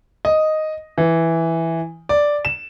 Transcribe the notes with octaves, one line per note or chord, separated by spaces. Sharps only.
D#5
E3
D5
E7